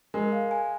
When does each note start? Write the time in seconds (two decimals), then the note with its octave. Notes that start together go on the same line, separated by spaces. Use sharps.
0.14 G#3 A#4
0.32 F5
0.51 G#5